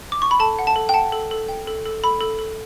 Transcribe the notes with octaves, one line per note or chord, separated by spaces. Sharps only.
D6
C#6
B5
A4 A5
F#5
A5
A4
G5
F#5 A5
A4
A4
G5
A4
A4
A4 B5
A4
A4